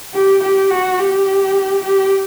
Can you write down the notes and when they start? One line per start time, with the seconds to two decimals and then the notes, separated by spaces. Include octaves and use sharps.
0.15 G4
0.43 G4
0.71 F#4
0.99 G4
1.84 G4